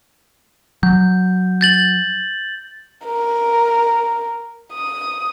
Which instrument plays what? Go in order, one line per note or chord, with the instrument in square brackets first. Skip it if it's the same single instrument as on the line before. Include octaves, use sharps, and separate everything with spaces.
[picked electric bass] F#3 [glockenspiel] G6
[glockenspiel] G6 A6 F#7
[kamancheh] A#4
D#6